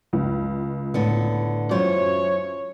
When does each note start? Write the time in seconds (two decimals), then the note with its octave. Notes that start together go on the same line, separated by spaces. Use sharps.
0.13 C#2
0.94 A2 D3 B3
1.71 F#2 E4 F4 C5 C#5